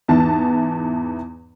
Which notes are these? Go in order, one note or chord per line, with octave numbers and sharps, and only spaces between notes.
E2 G#2 E3 B3 A5